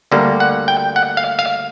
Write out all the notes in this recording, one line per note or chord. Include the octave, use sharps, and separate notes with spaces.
D2 D3 G3 A#3
F#5
G5
F#5
F5
F5